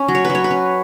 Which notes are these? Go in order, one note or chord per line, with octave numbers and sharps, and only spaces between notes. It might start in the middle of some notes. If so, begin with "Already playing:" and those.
Already playing: C#4
F#3
C#5
B4
F#3
C#5
B4
C#4